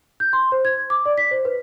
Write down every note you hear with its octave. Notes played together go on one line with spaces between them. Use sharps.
G6
C6
C5
G#6
D6
D5
B6
C5
B4